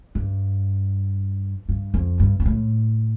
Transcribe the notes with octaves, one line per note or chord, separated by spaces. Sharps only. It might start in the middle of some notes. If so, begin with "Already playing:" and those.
G2
G2
F2
G2
G2
A2